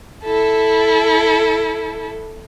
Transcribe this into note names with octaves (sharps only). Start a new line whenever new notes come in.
E4 A4